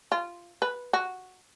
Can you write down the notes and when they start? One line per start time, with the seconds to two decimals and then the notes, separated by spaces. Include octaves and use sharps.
0.12 F4
0.62 B4
0.93 F#4